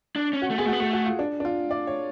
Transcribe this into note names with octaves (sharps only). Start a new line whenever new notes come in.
D4
C#4
F#4
A3
B3 G#4
A3 F#4
B3
A3 F#4
F#4
F4
D4
D4
F4
D5
C#5